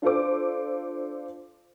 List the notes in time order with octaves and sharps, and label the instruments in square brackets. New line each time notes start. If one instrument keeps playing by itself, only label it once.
[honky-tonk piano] D4 F4 A4 C5 D6